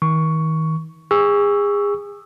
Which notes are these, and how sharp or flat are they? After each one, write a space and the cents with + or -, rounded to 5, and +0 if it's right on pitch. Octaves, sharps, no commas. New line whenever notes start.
D#3 +35 C#6 +10
G#4 -30 C#6 +15 E6 +5